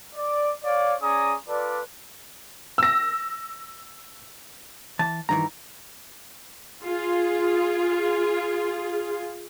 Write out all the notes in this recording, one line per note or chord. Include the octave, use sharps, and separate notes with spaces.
D5
C#5 D5 F5
C#4 G#4 D5 G#5 A#5 D#6
F4 A4 B4 D5
E6 A#6
E3 A5
G2 D#3 E3 A#5
F4 G#4